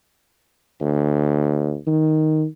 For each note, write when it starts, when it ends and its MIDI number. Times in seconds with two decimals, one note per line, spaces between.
0.81 1.76 38
1.87 2.45 51